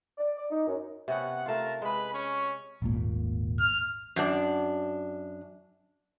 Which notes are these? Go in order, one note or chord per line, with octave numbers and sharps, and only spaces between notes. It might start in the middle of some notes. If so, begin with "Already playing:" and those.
D5
D5
D#4
F#2
C3 B3 C#4 F#5
A3 F4 A#4 A5
G#3 B4 B5
C#4 C#6
D#1 G#1 A#2
F6
F#2 D4